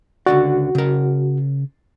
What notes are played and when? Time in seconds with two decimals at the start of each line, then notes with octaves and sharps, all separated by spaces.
0.26 C#2 D3 F#4 D5
0.75 C#3 A#4